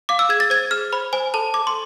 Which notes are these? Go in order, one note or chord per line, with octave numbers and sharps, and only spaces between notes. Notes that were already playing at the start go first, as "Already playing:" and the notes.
F5 D6
E6
G#4 G#6
A6
C5 G#6
G#4 F6
C5 B5
C5 G#5
A4 A5
A4 D6
C6